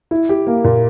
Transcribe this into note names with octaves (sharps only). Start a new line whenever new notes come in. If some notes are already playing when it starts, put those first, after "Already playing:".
E4
G4
A#3
A#2